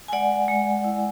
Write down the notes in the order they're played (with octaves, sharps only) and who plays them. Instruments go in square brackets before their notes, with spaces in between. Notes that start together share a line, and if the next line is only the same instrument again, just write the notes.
[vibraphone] G#5
G#3 D5 F#5
G#3
E4